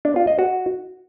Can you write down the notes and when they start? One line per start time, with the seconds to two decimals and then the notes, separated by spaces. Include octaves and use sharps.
0.05 D4
0.16 F4
0.27 D#5
0.39 F#4